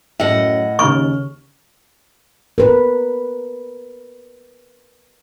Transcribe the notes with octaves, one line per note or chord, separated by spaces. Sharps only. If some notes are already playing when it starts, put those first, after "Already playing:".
F#2 A2 D#5 E5 F#5
D#2 C#3 C#6 F6
A#4 B4